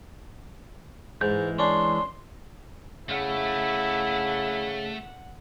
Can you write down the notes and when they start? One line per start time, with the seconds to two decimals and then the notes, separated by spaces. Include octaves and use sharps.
1.21 G#2 E3 G#3 G6
1.59 C#4 D4 C6
3.09 C#3 A3 E4 F#5